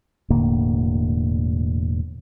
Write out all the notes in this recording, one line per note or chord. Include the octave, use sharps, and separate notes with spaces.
E1 A2 D3 A#3